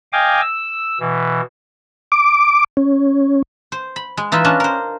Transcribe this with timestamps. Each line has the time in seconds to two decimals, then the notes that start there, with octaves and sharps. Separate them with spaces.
0.13 D#5 F5 G5 G#5 D6
0.41 E6
1.00 B2 E3
2.12 D6
2.77 C#4
3.72 C5
3.96 B5
4.17 G#3
4.32 E3 D#4 F4 B4 E5
4.44 C#4 D4 B4 D#5 A5
4.60 A#4 C5